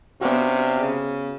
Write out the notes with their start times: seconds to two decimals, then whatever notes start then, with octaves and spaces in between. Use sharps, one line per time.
0.21 C3 B3 C#4 D4 F#4 F5
0.79 C#3